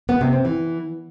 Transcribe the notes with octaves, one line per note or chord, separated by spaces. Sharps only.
B3
C3
C4
E3